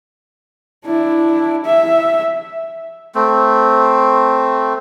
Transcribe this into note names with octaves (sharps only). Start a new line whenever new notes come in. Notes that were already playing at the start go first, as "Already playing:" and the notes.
D4 E4
E5
A3 C4